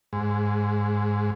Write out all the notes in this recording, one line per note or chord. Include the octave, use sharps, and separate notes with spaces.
G#2